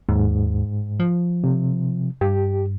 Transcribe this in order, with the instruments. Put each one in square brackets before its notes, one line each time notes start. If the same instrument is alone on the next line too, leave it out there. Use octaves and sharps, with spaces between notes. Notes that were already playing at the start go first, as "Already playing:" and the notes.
[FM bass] D#2 [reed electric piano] G#2
[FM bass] F3
[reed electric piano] C3
[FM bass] G2 [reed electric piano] G4